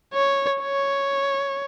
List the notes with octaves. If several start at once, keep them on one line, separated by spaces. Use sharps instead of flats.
C#5
C#5